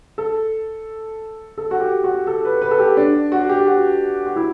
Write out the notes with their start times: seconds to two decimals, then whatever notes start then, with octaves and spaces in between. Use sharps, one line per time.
0.18 A4
1.58 A4
1.71 F#4
1.80 G4
2.04 F#4
2.27 A4
2.45 B4
2.62 B4
2.71 A4
2.79 G4
2.97 D4
3.32 F#4
3.49 G4
3.67 F#4
4.26 F#4
4.36 E4